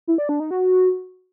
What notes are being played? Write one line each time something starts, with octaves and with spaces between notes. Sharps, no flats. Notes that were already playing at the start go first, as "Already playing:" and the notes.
E4
D5
D4
D#4
F#4